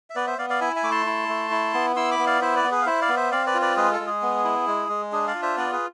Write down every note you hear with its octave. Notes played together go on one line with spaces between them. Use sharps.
E5
B3 B4 D5
C5 E5
B3 D5 F5
D5 F5
E4 E5 G#5
E5 G#5
A3 D6
A5 C6
E4
A3
E4
B3
E4 C6 E6
B5 D6
B3
D5 F5
E4 C5 E5
B4 D5
B3
G#4 B4
F5
E4 C5 E5
D5 F5
B3
C5 E5
C4 D5 F5
B4 D5
F4
B4 D5
G#3 G#4 B4
A4
G#3
G#4
B3
E4
G#3
G#3
D4 G#4
D5 F5
F4
C5 E5
B3 B4 D5
G#4 B4